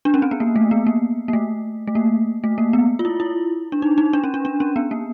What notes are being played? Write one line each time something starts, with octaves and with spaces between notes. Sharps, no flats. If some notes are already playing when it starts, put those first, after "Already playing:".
D4
C#4
C4
B3
A#3
A3
B3
A#3
A#3
A3
A3
A#3
A3
A#3
B3
F4
E4
E4
D4
D#4
D#4
D4
C#4
D4
D4
C#4
B3
A#3